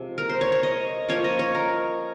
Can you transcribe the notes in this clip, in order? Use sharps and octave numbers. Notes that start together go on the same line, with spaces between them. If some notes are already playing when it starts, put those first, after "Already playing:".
Already playing: C3 F3 G#3 G4
A#4
C5
C#5
C#5
D#5
F3 A#3 C#4 C#5
D#5
C#5
A#4